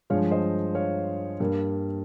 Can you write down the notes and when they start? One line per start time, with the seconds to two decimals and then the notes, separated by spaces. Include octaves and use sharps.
0.10 G2 F3 G#3 C#5 F5
0.31 C5 D#5
0.75 C#5 F5
1.40 G2 G3 A#3